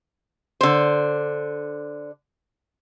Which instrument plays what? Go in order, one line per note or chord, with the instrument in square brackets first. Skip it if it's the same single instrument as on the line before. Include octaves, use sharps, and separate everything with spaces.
[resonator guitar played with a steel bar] D3 C5